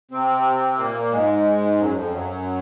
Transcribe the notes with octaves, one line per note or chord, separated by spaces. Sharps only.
C3 C4
A#2 A#3
G#2 G#3
F#2 F#3
F2 F3
F#2 F#3